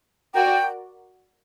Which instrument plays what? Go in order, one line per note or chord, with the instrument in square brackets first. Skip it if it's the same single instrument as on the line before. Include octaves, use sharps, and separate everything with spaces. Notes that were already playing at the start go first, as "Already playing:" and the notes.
[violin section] F#4 A#4 D5 [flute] G5